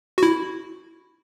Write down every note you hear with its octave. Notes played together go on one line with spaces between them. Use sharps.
F#4
E4